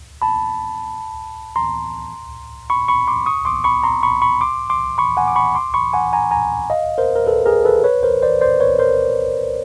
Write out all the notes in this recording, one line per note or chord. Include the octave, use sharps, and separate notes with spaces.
A5 B5
A#5 C6
B5 C#6
B5 C#6
C6 D6
C#6 D#6
C6 D6
B5 C#6
A#5 C6
B5 C#6
B5 C#6
C6 D6
C6 D6
B5 C#6
F#5 G#5
D6
B5 C#6
C6 D6
B5 C#6
F#5 G#5
G#5 A#5
G#5 A#5
D#5 F5
A#4 C5
A#4
A4 B4
G#4 A#4
A4 B4
B4 C#5
A#4 C5
C5 D5
C5 D5
B4 C#5
A#4 C5